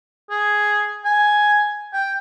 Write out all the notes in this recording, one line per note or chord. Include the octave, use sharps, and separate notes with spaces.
G#4
G#5
G5